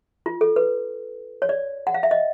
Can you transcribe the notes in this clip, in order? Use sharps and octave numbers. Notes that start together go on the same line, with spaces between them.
F4
A4
B4
C#5
D5
F#5
F5
E5
D#5